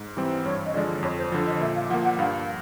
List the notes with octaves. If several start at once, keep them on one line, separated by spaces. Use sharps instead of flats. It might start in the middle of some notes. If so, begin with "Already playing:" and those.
Already playing: G#2
E3 G3 C4
G2 C#5
D#5
D3 F3 G#3 D5
F2 C#5
C5
D3 F3 C5
D#5
A#2 E5
F5
F3 A#3 F#5
F#5
G2 F5